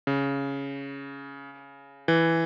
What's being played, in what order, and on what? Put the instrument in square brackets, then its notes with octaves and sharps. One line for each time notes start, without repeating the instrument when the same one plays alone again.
[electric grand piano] C#3
E3